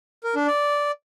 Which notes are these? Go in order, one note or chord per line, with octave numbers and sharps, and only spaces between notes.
A#4
D4
D5